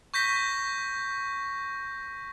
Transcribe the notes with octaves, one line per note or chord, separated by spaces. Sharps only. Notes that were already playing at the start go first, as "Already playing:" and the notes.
C#6 G6 A#6 B6